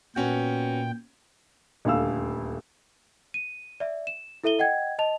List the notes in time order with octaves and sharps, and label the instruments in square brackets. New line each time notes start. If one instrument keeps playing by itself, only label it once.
[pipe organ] A#2 G5 [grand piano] B3 C#4 F#4
[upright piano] D#1 D2 F5 E6
[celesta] D#7
D5 E5
E7
E4 A4 E5 D#7 G7
D#5 F#5 G5 G#6
D#5 A5 F7